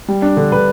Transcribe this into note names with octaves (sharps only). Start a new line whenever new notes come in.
G3
D4
D3
D3 B4